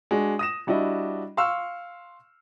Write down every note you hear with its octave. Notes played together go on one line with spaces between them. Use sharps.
G#3 D4 F#4
D#6 A#6 E7
G3 D4 E4 F#4 D#5
F5 C6 C#6 E6 F6